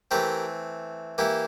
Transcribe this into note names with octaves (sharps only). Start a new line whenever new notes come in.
E3 A3 C4 G4 A#4
E3 A#3 E4 G4